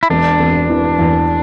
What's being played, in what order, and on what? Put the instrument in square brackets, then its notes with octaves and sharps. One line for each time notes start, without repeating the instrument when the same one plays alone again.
[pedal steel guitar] E4
[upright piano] E1 [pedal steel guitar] D4
[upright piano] E1
E3
E2